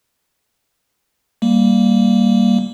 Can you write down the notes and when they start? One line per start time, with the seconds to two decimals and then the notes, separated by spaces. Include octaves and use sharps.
1.42 G3 A#3